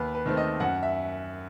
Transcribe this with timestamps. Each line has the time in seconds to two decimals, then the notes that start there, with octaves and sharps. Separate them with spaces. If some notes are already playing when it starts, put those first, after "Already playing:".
Already playing: D#2 B4
0.15 B4
0.26 D#3 A3 C4
0.37 D#5
0.60 F#2 F#5
0.83 E5